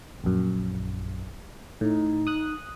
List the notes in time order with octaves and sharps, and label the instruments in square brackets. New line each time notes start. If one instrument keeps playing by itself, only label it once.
[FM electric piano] A#1 F#2
[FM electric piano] A2 [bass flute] D#4
[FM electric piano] D#6 F#6